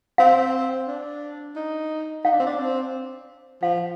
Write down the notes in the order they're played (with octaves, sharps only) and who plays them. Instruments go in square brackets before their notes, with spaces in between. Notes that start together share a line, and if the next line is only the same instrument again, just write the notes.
[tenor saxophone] C4 [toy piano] F5
[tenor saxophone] D4
D#4
[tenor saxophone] D#4 [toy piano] F5
[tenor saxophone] D4
C4
D4
C4
[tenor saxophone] F3 [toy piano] F5